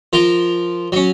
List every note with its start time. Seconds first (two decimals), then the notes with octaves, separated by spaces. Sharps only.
0.13 F3 F4 A#4
0.92 F#3 C#4